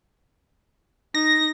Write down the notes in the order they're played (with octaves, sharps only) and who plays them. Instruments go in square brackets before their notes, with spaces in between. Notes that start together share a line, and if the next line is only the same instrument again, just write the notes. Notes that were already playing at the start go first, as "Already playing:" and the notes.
[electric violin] D#4 [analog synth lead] A#6